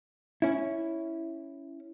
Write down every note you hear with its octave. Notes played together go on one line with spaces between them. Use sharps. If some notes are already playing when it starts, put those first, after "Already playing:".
C#4 E4